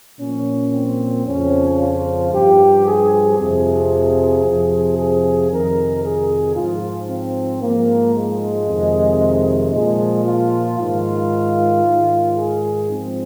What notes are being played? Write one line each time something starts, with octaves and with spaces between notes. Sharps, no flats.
A#2 F3 C#4
C4
F2 C#3 F3 C#4
F4
G2 F3 G4
G#4
F2 C3 F3 G#4
F2 C3 F3
G#4
F2 C3 D#3 A#4
G#4
G#2 F3 F4
C4
G#2 F3 A#3
G#3
F2 C3 D#3
A#2 F3 G#3
F4
G#2 D#3 F4
G#2 D#3
G#4
G#2 F3 C4